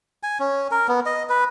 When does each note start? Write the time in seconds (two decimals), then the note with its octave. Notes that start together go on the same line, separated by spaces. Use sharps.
0.23 G#5
0.40 C#4
0.71 A#4
0.88 B3
1.06 D#5
1.29 B4